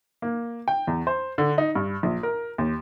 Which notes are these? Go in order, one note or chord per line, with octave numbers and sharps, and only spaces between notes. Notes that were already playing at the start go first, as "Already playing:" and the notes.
A#3
G5
E2
C5
D3
D#4
G2
A#1
A#4
D#2